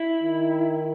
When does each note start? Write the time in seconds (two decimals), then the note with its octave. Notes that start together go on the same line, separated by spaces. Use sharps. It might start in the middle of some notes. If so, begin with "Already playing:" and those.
Already playing: E4
0.23 D#3